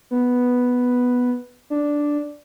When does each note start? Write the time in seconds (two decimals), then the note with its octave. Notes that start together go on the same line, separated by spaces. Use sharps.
0.11 B3
1.70 D4